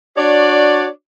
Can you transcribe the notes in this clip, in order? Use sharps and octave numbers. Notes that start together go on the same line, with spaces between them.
D4 F#4 C#5 D5